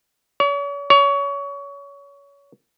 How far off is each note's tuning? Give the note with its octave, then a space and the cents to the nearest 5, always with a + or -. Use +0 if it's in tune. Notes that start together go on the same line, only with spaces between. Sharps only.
C#5 +40
C#5 +25